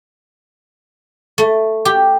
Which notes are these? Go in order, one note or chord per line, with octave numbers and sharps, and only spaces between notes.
A3
G4